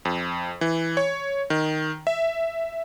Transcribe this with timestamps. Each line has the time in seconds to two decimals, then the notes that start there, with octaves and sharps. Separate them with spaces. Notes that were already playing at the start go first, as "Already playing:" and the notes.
0.05 F2
0.61 E3
0.97 C#5
1.50 D#3
2.07 E5